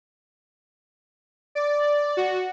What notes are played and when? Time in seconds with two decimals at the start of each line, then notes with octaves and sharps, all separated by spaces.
1.55 D5
2.17 F#4